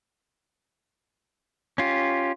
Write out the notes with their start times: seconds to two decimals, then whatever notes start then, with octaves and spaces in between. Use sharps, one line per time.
1.78 C#4 F4 G4